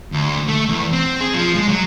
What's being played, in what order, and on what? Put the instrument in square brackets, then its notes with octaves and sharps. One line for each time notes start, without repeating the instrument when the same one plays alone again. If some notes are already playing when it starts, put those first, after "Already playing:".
[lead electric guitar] D2
A3
E2
C4
G#4
F3
G#3
F#3